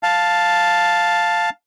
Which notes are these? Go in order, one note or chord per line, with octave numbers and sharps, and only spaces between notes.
F5 A5